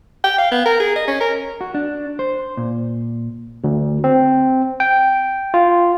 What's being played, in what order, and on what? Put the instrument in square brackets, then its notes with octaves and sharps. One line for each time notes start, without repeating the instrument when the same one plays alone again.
[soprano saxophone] G5
F5
B3
A#4
G#4
D#5
C#4
A#4
[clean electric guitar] F#4
D4
C5
A#2
[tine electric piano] D2
C4
G5
F4